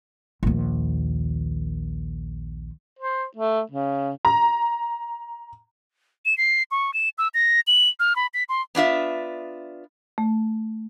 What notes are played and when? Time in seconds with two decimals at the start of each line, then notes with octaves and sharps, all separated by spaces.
0.43 A#1 D#2
2.99 C5
3.36 A3
3.71 C#3
4.25 A#5
6.26 E7
6.38 C7
6.71 C#6
6.94 E7
7.18 E6
7.34 A#6
7.67 F#7
8.00 F6
8.16 B5
8.34 B6
8.49 C6
8.75 B3 D4 F4 E5
10.18 A3